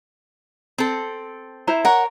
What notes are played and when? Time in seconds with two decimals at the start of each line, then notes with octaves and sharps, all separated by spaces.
0.78 C4 A4
1.67 E4 C5 A#5
1.85 A#4 C#5 F#5